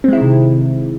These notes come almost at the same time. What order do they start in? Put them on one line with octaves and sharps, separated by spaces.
C4 G#3 E4 D#3 C3